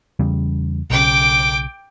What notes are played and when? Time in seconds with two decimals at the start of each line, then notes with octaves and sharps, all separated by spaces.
0.19 E2 C#3 G3
0.90 B1 C#3 G5 D6